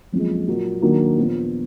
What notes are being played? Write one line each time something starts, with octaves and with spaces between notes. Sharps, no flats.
F#1 F2 F3 G#3
A#2 F#3 A#3
D#2 D#3 F#3 A#3 D4
A#2 F3 B3